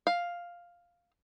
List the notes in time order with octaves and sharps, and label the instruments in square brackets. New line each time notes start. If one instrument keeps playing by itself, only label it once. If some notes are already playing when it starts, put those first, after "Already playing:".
[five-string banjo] F5